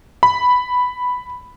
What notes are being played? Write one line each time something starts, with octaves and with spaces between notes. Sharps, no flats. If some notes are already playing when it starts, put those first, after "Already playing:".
B5